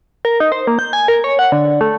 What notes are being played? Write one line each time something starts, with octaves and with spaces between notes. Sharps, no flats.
A#4
D#4
C5
A#3
G6
G#5
A#4
C#5
F#5
D3
A3